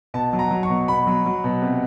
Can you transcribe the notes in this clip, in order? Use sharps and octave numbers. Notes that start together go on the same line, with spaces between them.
B2 A5
F#3
A#5
F#3
C#6
B2
B2 B5
F#3
F#3
B2
C3